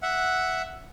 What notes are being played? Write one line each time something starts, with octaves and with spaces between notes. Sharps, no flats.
E5 F#5